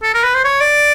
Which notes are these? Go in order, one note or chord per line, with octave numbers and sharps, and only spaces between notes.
A4
A#4
B4
C5
C#5
D5